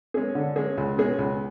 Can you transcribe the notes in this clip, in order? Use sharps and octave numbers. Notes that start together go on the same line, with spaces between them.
G#3 C#4 G#4
D3
G#3 C#4 G#4
C#2
B2 G#3 C#4 G#4
C#2